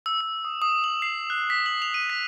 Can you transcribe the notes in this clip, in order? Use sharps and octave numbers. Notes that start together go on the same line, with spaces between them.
E6
E6
D#6
D#6
F#7
C7
F#6
B6
F#7
F7
D#7
B6